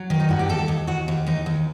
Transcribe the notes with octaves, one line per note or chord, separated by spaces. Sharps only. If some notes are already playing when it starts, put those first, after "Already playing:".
Already playing: F#3
D#3
D#4
G2 F#4
G4
D#2 A4
D#2
D#2 F#4
D#2
D#2 D#4
D#2